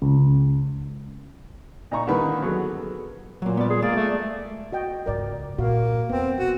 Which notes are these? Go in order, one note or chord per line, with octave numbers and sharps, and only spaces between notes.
C#2
A#2 D#4 A#5 C#6
D3 D#3 G3 A#3 B4
F#3 B3 G#4 A4
A#2 F#3 A#3
G3 B3 D5
G#4
G#3 A#3 D5
A3
F#4 D#5 G5
C#2 G#2 A#4 D5
G2 A#2 A#3 F#4 F5
E2 B3 C4
E1 F#4